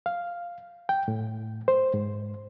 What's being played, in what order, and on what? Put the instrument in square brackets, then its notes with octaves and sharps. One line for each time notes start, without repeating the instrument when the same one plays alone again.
[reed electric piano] F5
G5
A2
C5
G#2